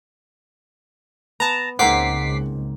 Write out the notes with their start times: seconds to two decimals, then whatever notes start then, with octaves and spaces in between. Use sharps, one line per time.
1.40 B3 A5 A#5
1.79 C#2 G#2 A#3 C4 F#5 D6 B6 C7